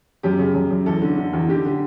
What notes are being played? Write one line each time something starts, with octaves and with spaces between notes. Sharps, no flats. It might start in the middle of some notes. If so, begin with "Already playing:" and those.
F#2 G4
C#3
F#2
F#2
E2 A4
D3
D3
E2
D3 G4
D3